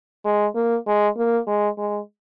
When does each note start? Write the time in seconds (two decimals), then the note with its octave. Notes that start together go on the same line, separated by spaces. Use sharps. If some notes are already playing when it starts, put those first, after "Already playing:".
0.25 G#3
0.55 A#3
0.87 G#3
1.17 A#3
1.47 G#3
1.78 G#3